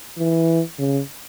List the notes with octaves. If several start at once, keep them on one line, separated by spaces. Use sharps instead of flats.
E3
C#3